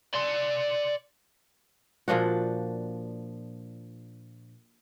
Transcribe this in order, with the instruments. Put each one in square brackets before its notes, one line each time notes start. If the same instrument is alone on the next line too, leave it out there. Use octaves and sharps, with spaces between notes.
[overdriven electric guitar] D5 C6
[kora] A#2 F3 D4 F#4